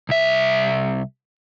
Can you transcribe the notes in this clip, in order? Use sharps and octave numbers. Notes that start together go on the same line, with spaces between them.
C2 E5